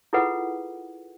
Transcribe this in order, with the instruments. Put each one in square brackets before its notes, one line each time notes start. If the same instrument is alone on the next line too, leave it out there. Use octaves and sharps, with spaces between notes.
[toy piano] E4 F4 G#4 A4 B4 F#5